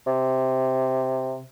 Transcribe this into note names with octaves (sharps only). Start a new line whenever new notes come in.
C3